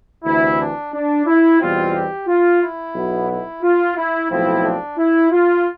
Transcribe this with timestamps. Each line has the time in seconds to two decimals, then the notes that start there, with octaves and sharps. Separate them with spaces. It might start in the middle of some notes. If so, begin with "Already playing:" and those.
0.25 D2 C3 E3 E4
0.59 D4
0.92 D4
1.26 E4
1.60 E2 B2 G3 C4 F4
1.94 G4
2.27 F4
2.62 E4
2.95 B1 B2 B3
3.29 E4
3.62 F4
3.96 E4
4.30 B1 A2 F3 C4 E4
4.64 D4
4.98 E4
5.32 F4